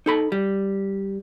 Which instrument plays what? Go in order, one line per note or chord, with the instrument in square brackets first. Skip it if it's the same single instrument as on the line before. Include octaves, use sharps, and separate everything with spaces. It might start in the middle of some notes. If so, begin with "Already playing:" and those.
[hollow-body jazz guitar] D#4 A4 B5
G3